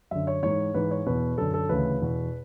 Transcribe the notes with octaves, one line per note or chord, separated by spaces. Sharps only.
F#2 D3 E5
C#5
G#2 E3 C#5
G#2 E3 B4
C#5
E2 B2 B4
F#2 D3 A4
A4
D2 C#3 E3 B4
E2 B2